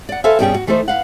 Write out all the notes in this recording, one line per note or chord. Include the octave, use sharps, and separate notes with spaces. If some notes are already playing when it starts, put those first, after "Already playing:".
D5 F#5
A4 B4 C5 E5 F5 G#5
G2 B2 G3 C#4 G#4 G5
F#4
E3 A3 D#4 A4 C5
B4 F5 F#5